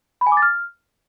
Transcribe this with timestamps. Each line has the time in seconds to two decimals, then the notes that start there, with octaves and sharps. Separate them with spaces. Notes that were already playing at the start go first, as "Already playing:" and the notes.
0.21 B5
0.27 G#5
0.32 D6
0.37 A6
0.42 F6